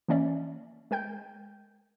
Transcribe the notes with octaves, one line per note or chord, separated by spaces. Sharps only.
E3 A#3 C#4 D5 E5
G#3 A#4 G5 G6